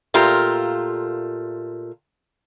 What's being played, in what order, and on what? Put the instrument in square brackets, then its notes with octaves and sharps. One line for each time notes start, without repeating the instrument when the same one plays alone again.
[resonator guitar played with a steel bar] A#2 A3 F4 G4 A#4